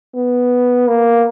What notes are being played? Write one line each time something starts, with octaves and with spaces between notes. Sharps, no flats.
B3
A#3